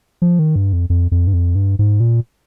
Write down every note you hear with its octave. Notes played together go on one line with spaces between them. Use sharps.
F3
D#3
G2
F2
F2
F2
G2
F2
G2
G#2
A#2